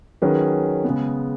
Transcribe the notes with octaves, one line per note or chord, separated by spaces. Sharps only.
D#3 F#3 C#4 G#4 B4
C#3 G#3 B3